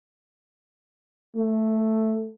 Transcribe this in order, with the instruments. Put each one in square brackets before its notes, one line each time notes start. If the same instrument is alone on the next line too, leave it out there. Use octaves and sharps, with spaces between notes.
[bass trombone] A3